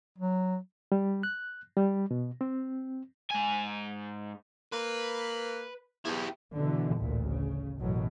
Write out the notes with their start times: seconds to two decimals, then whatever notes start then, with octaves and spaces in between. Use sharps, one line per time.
0.18 F#3
0.92 G3
1.23 F#6
1.77 G3
2.11 B2
2.41 C4
3.31 G#2 G#5
4.73 A#3 B4
6.05 E2 E4 G4
6.54 B2 D3 E3
6.98 A1 D2 A#2
7.31 C#3
7.79 A1 F#2 B2 F#3